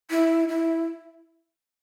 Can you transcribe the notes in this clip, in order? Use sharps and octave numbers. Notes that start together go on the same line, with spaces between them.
E4
E4